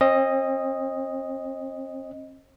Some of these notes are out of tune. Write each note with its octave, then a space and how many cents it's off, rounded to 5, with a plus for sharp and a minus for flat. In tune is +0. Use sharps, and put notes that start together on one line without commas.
C4 +40 D#5 +0